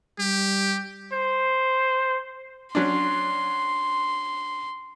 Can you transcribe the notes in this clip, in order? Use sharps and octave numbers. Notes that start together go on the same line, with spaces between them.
G3 G4
C5
F#3 C#4 D4 C6